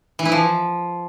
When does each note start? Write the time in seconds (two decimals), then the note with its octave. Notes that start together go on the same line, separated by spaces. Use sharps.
0.19 E3
0.25 E4
0.32 F3